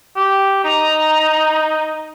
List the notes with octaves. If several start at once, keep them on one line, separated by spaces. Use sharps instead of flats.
G4
D#4 A#5